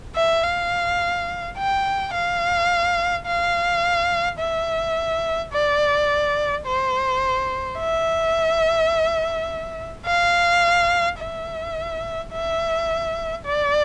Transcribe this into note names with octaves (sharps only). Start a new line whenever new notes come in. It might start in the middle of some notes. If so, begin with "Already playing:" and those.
E5
F5
G5
F5
F5
E5
D5
C5
E5
F5
E5
E5
D5